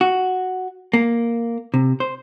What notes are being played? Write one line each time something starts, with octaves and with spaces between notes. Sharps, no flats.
F#4
A#3
C3
C5